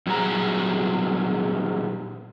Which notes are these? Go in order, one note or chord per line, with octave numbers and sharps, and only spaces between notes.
A#2 F#3 G3 G#4 A#4 A#5